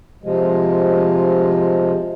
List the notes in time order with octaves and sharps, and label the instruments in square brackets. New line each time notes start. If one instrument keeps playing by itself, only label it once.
[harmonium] C3 F3 G#3